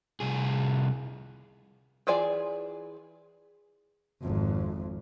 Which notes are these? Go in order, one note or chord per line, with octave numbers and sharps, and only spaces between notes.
C2 G#4
E3 F4 G#4 D5 G#5
G#1 F2